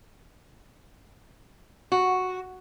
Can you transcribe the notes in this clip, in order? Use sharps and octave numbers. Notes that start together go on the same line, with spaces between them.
F#4